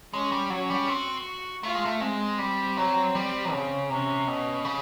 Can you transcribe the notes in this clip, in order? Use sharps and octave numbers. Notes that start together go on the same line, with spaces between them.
G#3 C#4
G3
F#3 C#4
G3
C4 F#4
A3 F4
G#3
A3
G#3 C4
G3
F#3
G3
C#3
C3 C#4
B2
C#3